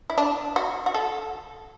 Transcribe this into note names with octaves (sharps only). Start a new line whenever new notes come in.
E4
D4
F#4
F#4
A4